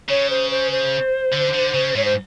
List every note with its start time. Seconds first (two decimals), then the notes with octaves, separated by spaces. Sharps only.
0.09 C#3 C#5
0.30 C5
0.51 C5
0.71 C5
1.33 D3
1.54 D3
1.74 C#3
1.96 G#2 C#5
2.05 C5